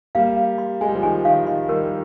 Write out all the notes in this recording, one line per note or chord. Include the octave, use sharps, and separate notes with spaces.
G3 A#3 F5
F5
C6
G#3 G#5
G3
F3
D#3 G#5
D#3 F5
D#3 C6
D#3 G3 A#4